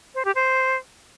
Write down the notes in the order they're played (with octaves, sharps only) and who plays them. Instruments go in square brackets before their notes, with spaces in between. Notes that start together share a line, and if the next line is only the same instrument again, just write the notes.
[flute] C5
G4
C5